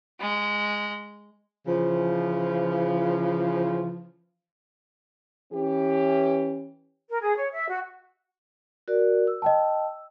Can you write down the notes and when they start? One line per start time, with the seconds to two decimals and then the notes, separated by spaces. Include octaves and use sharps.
0.20 G#3
1.67 C#3 E3 F3
5.52 E3 C#4 G4
7.10 A#4
7.22 G#4
7.37 C#5
7.54 E5
7.69 F#4
8.88 F#4 A#4 D5
9.27 E6
9.42 D#5 G5 A5